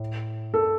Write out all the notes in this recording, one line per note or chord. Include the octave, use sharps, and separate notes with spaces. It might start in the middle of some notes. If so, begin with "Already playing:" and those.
Already playing: A2
G2 A4